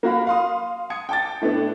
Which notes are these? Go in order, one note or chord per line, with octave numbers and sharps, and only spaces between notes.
A#3 F#4 F5 B5
F5 C6 D#6
D#6 G#6 C#7
G5 A5 D6 A6
A2 A3 B3 D4